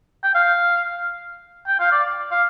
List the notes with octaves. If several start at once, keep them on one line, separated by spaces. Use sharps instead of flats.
G5
F5
G5
F5
D5
F5